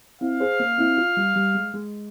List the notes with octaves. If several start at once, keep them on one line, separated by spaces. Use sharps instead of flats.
C4 E4 F5
G#4 C5
A#3 C#4
C4 E4
C#4 F4
G3
G3
G#3
G#3